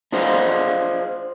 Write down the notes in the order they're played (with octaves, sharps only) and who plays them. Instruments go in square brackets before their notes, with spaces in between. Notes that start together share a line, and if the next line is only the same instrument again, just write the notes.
[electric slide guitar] D4 F4 G#4 C5 D#5 F#5